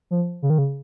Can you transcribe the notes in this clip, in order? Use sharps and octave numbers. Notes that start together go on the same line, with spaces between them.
F3
C#3
D#3
C#3